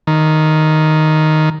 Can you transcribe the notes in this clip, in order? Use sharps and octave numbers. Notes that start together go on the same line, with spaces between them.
D#3